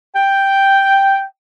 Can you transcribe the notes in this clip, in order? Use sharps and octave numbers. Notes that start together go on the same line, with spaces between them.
G5